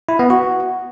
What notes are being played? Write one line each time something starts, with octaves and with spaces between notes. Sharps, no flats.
E4
B3
F#4